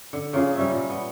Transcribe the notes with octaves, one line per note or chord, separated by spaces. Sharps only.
D3
C#3 A#3 F4 G#4
G3 C#4 E5
A#2
B3